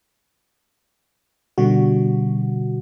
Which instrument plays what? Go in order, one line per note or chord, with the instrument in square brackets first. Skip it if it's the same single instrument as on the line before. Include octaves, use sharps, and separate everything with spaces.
[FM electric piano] B2 D3 G3 F#4